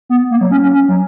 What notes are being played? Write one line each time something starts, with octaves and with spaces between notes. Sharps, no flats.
B3
A#3
F#3
C#4
C#4
C#4
F#3